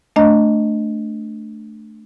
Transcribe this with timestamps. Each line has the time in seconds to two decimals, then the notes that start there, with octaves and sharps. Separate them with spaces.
0.16 A3 D4 D#5 A#5